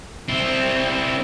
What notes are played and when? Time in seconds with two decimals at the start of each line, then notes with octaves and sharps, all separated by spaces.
0.28 C4 E4